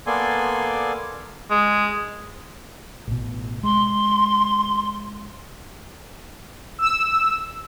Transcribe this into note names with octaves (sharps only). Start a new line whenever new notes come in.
A#3 B3 A4 D5 G#5 C6
G#3
A1 B2
G#3 C6
E6